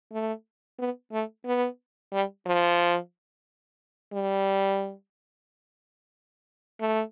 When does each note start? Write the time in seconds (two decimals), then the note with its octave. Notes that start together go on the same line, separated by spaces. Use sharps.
0.12 A3
0.79 B3
1.12 A3
1.46 B3
2.13 G3
2.46 F3
4.13 G3
6.81 A3